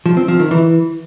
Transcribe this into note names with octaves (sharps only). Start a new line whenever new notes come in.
F3
C4
F3
D#3
E3